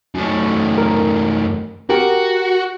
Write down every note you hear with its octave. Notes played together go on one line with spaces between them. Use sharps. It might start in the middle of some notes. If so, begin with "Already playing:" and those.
F#2 A3
A#4
F#4 G4 A#4